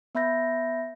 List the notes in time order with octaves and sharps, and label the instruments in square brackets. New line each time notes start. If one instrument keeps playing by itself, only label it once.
[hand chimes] B3 E5 B5 G6 A#6